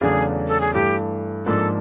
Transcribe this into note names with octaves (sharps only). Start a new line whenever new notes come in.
E2 C#3 F#3 A3 D4 G#4
A4
G#4
G2 E3 A3 G4
G#2 F3 A#3 D4 A4